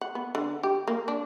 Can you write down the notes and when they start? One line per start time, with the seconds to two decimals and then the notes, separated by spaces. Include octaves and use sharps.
0.01 F#5
0.15 B3
0.35 D3
0.63 G4
0.88 A#3
1.08 D4